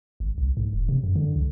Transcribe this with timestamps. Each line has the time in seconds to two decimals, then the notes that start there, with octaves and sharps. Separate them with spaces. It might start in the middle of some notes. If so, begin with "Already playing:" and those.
0.20 G#1
0.38 C2
0.57 G#2
0.73 E1
0.89 C3
1.04 F#2
1.15 D3
1.36 C#2